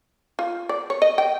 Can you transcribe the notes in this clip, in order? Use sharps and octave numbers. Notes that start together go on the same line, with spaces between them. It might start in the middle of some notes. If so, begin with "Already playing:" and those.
F4
D5
C#5
D#5
G5